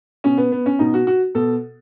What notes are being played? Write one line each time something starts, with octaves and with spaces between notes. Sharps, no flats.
B2 C#4
B3
B3
C#4
B2 D#4
F#4
F#4
B2 A4